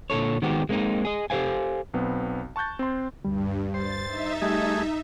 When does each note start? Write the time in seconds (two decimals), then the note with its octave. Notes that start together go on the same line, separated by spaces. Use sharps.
0.10 A#2 D3 A4 C#5
0.42 D#3 G#3 B3 C4 F#4 G4
0.69 G#3 A#3 C4 C#4 D#4
1.05 G#4 D#5
1.30 G4 A4 C5 F5 G#5
1.94 B1 B3 C4
2.56 A5 C#6 F#6 G6 A6
2.79 C4 C6
3.25 D2 G2 G3
3.74 C5 A6
4.08 D#4 E5
4.42 G3 A3 G4 G#4